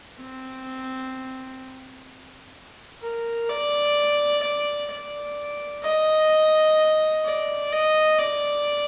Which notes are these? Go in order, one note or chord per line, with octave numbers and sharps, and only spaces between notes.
C4
A#4
D5
D5
D5
D#5
D5
D#5
D5